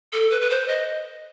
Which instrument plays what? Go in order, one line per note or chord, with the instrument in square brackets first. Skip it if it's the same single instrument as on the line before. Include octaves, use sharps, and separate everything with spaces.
[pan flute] A4
B4
B4
C5
D#5